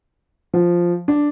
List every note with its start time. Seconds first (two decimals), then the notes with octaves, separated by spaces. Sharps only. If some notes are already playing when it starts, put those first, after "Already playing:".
0.54 F3
1.08 D4